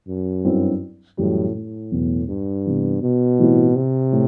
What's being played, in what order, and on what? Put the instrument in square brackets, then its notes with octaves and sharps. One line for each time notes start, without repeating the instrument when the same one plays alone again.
[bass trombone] F#2
[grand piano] G2 F#3 C4 E4
[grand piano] F#2 E3 G3 [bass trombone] A2
[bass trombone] A2
[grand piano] E2 B2 F#3 B3
[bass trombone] G2
[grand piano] C3 E3 B3
[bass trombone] B2
[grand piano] A2 E3 G3 C4 E4
[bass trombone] C3
[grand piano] A2